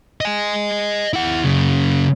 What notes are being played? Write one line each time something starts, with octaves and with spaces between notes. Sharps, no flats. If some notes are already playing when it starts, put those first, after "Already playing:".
D#5 G#5
E4 F#5
F#2 C#3